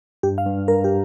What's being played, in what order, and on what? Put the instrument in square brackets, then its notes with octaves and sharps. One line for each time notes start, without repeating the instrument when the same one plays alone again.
[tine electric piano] G2 [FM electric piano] G4
[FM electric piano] F5
[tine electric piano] G2
[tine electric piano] G2 [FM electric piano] A#4
[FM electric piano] G4